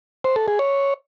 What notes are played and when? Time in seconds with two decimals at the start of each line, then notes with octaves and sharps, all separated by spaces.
0.24 C5
0.36 A4
0.48 G#4
0.59 C#5